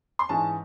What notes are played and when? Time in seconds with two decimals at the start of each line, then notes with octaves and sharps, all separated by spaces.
0.19 C6
0.29 G#2 E3 G#3 C#4 A5